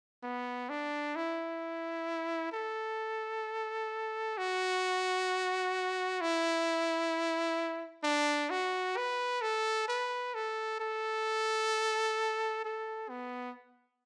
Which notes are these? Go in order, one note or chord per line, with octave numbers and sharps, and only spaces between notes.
B3
D4
E4
A4
F#4
E4
D4
F#4
B4
A4
B4
A4
A4
A4
B3